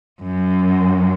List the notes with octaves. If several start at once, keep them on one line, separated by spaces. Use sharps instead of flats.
F#2